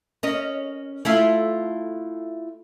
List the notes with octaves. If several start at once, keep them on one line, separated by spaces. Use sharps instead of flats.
C#4 A#4 D#5
A3 E4 F4